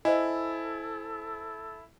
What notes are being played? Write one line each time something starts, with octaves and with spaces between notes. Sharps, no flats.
E4 A4 C5 D#5 G#5